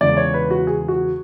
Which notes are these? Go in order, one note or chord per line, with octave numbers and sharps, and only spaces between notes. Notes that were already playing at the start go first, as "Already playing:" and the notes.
E2 C#3 E3 G#3 D5
C#5
B4
F#4
G#4
F#4